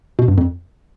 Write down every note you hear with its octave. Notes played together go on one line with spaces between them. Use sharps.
B2
G2
F2